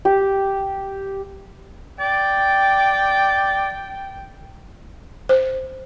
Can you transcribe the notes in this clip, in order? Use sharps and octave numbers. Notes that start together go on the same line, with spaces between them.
G4
D5 G5
C5